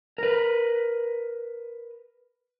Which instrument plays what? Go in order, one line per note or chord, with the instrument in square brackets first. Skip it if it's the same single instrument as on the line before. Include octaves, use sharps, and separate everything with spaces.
[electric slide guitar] A#4 B4